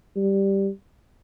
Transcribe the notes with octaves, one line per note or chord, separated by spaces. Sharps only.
G3